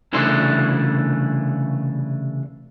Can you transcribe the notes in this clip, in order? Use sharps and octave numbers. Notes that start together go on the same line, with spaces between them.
C2 C#3 E3 A3 D4 C6